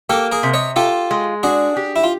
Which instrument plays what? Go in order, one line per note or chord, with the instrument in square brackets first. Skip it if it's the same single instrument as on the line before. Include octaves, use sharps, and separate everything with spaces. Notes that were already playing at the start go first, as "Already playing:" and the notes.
[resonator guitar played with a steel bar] A#3 [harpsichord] G4 A4
[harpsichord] G#4 A#4
[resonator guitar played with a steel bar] C3
[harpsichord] C#5 D#5
[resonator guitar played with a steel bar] F4 [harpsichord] G4 A4
[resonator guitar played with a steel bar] G#3
[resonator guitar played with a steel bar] D4 [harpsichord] F#4 G#4
[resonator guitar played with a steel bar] G4
[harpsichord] E4
F4